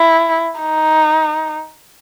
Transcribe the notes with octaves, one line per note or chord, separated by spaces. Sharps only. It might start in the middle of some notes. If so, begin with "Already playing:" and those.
Already playing: E4
D#4